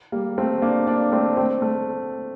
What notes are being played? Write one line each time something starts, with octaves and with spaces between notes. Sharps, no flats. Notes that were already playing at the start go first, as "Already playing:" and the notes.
G3 A#3
A3 C4
A#3 D4
A#3 D4
A3 C4
A3 C4
A3